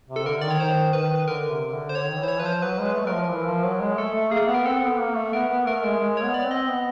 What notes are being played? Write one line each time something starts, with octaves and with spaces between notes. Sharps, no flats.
C3
A4
D3 A#4
D#3 D5
C#5
D#3 C5
D#3 B4
B4
D3 A#4
C3
D3
C5
D3 C#5
D#3
E3
C5
C#5
F3 B4
C5
F#3 B4
G#3
B4
A3
F#3 A#4
F3
E3
F3
F#3
G#3
A3 A4
A3
A#3 G#4
B3
A#4
C4 A4
B3
A#3
A3
B3 A#4
B3
A3 A#4
G#3
G#3
C#5
B3
D5
C4
D#5
B3